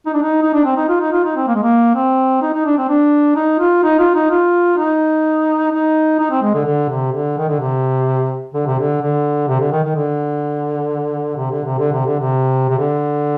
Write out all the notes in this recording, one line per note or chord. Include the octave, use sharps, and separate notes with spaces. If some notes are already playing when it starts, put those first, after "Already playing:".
D#4
D4
D#4
D#4
D4
C4
D#4
F4
D#4
F4
D#4
C4
A#3
G#3
A#3
C4
D#4
D#4
D4
C4
D4
D#4
F4
D#4
F4
D#4
F4
D#4
D#4
D#4
C4
G#3
D3
D3
C3
D3
D#3
D3
C3
D3
C3
D3
D3
C3
D3
D#3
D#3
D3
C3
D3
C3
D3
C3
D3
C3
C3
D3